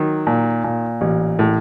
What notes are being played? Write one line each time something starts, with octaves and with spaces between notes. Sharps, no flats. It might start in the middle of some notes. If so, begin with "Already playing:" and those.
Already playing: D#3 F#3
A#2
A#2
A1
A2